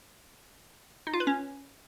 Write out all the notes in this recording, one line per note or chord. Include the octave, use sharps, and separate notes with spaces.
D#4
F4
B4
C#4